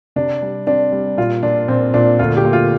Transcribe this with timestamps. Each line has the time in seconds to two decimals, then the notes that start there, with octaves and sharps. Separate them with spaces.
0.16 C3 D4
0.42 G3
0.67 C4 D4
0.92 G3
1.17 A#2 F4
1.43 A#2 D4
1.68 A#2 C4
1.94 A#2 D4
2.19 D2 F4
2.37 G4
2.45 A#3
2.53 F4